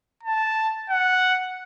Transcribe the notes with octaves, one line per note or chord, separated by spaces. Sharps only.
A5
F#5